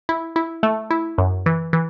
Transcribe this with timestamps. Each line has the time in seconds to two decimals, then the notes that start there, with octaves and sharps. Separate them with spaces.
0.09 E4
0.36 E4
0.63 A3
0.91 E4
1.18 F#2
1.46 E3
1.73 E3